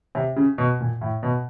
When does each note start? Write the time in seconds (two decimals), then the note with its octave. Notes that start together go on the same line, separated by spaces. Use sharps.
0.15 C3
0.36 C#3
0.58 B2
0.80 A#2
1.01 A2
1.23 B2